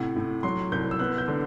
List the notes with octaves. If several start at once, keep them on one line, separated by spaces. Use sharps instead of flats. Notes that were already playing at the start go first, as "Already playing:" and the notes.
Already playing: A2 C3 F#5
A2
F#3 C6
C2 G6
E6
B3 F#6
G6
D3